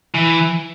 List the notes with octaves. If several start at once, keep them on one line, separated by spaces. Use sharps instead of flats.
E3